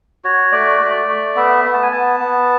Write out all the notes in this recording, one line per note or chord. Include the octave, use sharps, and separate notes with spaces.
F#4 C#5
A3 D5
A3
A3
B3 E5
B3
A5
G#5
B3 A5
B3